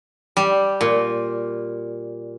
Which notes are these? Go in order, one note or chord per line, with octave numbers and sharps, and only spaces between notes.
G3
A#2